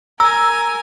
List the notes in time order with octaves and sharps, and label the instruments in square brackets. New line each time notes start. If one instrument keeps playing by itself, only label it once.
[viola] A#4 G#5 [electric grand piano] A#5 [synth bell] E6